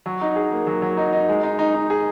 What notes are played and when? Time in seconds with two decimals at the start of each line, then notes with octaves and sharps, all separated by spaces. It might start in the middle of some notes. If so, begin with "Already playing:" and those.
0.06 F#3
0.21 D#4
0.36 G#4
0.52 A#3
0.67 F#3
0.82 F#3
0.97 D#4
1.13 D#4
1.29 G#3
1.43 D#4
1.59 D#4
1.74 D#4
1.90 G#4